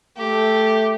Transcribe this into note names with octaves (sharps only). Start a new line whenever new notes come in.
A3 G4